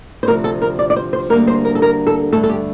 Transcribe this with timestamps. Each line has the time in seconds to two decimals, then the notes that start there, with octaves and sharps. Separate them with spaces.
0.23 C5
0.27 D2 C3 F3 C4 A#4
0.44 A4
0.62 A#4
0.79 D5
0.90 D5
0.96 C5
1.13 C5
1.30 D2 D3 G3 A#3 A#4
1.47 C5
1.65 A#4
1.75 A4
1.82 A#4
2.07 A4
2.32 G2 D3 A3 A4
2.44 A4
2.49 G4